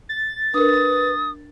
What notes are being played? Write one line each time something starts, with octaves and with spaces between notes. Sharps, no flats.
A6
D4 A#4 B4 D#6